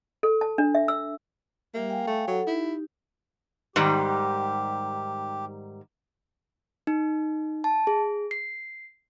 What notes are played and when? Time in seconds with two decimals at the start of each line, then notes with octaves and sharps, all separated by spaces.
0.23 A4
0.41 A5
0.58 D4
0.75 E5
0.88 E6
1.74 G3 A#3 G4 E5
1.90 F5 G5 G#5
2.07 A3
2.28 F#3 A4 F#5
2.47 D#4 E4 G4
3.76 G#2 D#3 G3 G4
6.87 D#4
7.64 A5
7.87 G#4
8.31 C7